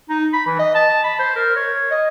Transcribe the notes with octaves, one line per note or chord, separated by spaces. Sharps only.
D#4
B5
E3
D#5
A5
B5
C5
A#4
C#5
D#5